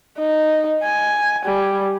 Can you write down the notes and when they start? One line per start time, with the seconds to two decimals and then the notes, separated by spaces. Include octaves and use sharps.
0.19 D#4
0.84 G#5
1.46 G3